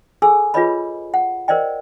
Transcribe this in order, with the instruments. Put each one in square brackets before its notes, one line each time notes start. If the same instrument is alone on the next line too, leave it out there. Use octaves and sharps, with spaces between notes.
[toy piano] G#4 A4 G#5 E6
F4 G#4 B4 C#5 D#5 B5
F#5
A#4 C5 D5 D#5 G5